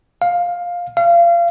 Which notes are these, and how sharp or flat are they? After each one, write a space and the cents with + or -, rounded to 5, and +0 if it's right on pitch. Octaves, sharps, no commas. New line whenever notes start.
F5 +10
F5 -30